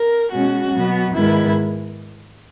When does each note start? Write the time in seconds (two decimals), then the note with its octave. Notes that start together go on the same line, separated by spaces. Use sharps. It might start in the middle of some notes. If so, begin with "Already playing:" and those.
Already playing: A#4
0.30 B2 G#3 C#4 F#4
0.72 B2 F#3 B3
1.13 G#2 D#3 G#3 B3 E4